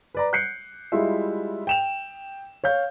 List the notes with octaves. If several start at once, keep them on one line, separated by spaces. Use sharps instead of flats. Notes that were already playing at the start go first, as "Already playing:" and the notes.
B4 D5 A#5
F#6 G6 C7 C#7
G3 G#3 E4 F4 E5
G5 E7 F7
C#5 F5 G6